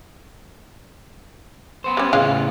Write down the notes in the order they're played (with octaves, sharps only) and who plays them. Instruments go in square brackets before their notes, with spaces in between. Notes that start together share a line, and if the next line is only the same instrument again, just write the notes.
[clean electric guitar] B3 C5
[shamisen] G3 C#4
[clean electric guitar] A2 C#3 E3 [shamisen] G#3 C#4 F4